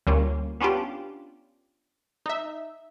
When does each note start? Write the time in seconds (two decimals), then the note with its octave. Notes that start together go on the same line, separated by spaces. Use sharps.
0.07 D2 G3 A#3 C#4 F4
0.60 B3 C#4 D4 F4 G4
2.26 D#4 E5